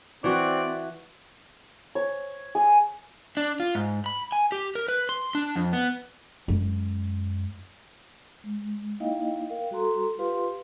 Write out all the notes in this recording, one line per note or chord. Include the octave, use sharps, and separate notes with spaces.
E3 C4 F#4 D5
C#5
G#4
D4
F4
G#2
B5
G#5
G4
A#4
B4
C6
D4
F2
B3
F#2 G#3
G#3
A#3 D#4 E4 D#5 F5 G5
A#4 F5 G5
G3 F#4 A4 A#5 C6
F4 G4 B4 F5 C6